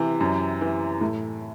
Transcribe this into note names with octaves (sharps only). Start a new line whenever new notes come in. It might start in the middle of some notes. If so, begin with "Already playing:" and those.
Already playing: C3 E3
F#2
E3
A2